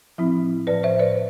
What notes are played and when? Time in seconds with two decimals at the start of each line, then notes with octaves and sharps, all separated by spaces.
0.18 A2 F3 C4 E4
0.67 A2 F3 B4 D5
0.83 C5 E5
0.99 B4 D5